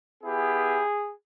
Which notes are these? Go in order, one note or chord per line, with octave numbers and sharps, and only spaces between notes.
B3 E4 G4 G#4